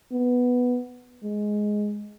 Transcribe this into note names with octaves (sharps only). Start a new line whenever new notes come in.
B3
G#3